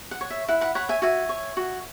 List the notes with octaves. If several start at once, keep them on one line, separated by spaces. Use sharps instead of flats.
F#5
C#5
E5
E4 F#5
F#5 B5
C#5 F#5 B5
E5 G#5
F#4 E5 G#5
C#5
F#4